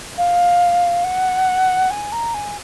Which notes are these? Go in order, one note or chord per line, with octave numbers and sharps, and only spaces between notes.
F5
F#5
G#5
A#5
G#5